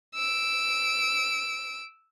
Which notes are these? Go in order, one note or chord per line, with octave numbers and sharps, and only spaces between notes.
E6 D7